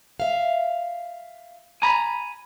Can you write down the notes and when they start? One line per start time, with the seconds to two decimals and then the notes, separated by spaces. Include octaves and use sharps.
0.20 E5 F5
1.82 G#5 A#5 B5